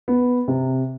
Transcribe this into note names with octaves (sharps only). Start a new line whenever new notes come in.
B3
C3